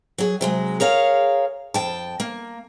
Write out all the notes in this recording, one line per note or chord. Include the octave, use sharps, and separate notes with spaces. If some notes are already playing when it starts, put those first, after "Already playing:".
F#3 G#4
C3 F#3 G#3
G#4 A#4 C#5 F5
F2 G5 A5
A#3